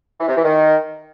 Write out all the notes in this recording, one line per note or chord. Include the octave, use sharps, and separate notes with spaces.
E3
C3
E3
D#3